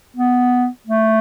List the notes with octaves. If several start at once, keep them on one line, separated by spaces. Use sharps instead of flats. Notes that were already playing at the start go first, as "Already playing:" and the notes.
B3
A3